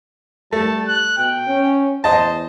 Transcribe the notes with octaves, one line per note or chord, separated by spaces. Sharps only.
G3 A3 A5
F#6
B2 G5
C#4
E2 C5 D#5 A5